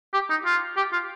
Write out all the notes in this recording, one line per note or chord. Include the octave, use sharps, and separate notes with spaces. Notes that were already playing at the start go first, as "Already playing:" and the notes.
G4
D#4
F4
G4
F4